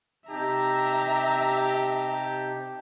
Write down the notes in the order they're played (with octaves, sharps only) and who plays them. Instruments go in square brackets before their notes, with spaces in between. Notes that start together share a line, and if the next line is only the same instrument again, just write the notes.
[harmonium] C3 D#4 A5 [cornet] G4 [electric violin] E5 A#5